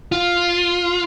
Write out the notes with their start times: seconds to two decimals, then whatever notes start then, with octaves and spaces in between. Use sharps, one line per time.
0.12 F4